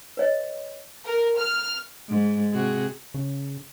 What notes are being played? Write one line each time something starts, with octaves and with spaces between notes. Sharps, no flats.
B4 C#5 D#5
A#4
F6
G#2
C3 F#4 G#4
C#3